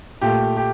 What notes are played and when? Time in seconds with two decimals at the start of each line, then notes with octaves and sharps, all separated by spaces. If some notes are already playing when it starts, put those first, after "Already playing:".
0.21 A#2 A3 G4
0.57 G4